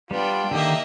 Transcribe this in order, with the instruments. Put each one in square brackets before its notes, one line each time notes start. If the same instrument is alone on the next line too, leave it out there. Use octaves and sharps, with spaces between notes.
[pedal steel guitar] G3 [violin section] B3 [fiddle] D4 G5 [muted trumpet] F4
[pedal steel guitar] D3 D#3 [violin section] A#3 D#5 E5 [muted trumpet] G4